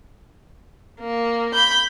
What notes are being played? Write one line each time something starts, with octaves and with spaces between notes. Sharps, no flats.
A#3
B5 G6